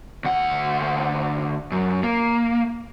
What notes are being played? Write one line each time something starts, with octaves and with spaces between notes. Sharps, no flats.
D2 F#5
F#2
A#3